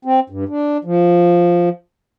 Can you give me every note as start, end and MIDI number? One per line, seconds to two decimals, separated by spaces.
0.05 0.20 60
0.30 0.44 43
0.49 0.78 62
0.85 1.69 53